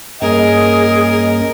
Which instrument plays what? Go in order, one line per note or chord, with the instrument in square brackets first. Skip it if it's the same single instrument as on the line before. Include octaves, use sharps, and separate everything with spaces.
[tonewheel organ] G2 A#3 C#4 [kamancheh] G#4 [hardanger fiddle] A#4 [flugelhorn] D#5